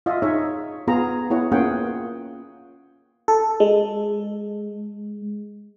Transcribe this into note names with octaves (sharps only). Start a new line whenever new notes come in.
F4 D#5 E5
D#4 G#4 C#5 E5
B3 F4 G#4 A#5
B3 E4 G#4 C#5 F#5
A#3 C#4 F4 G#4 F#5 G5
F4
A4
G#3